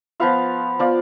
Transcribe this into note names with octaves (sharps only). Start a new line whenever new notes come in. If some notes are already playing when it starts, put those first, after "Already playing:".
F3 B3 F4 F5
F3 B3 F4 D5